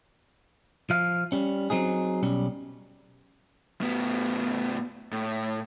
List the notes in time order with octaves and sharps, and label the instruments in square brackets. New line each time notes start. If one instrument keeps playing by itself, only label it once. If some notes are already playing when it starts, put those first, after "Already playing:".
[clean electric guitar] F3 F5
G3 C#4
F#3 C4 D#4 G#4
B1 G3 C#4
[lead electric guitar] A2 B3
A2